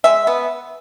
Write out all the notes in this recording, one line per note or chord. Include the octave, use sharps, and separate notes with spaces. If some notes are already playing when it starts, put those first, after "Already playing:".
G#3 E5
B3